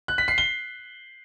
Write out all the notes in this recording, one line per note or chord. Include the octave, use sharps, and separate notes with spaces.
F#6
B6
C7
G7